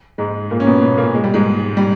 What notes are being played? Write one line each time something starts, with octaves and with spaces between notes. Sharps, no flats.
G#2 G#3
A#2 A#3
C#4
B2 B3
B2 B3
A#2 A#3
G#3
G3
G#2 G#3
G3